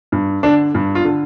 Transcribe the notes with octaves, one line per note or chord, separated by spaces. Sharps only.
G2
D3 D4
G2
F4
D3